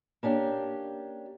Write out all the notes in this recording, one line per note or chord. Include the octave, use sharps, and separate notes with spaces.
A#3 C#4 D4 G4